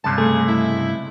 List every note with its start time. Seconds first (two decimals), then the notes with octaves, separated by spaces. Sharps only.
0.04 C#2 G2 C3 A5
0.18 A3 G#4
0.48 E4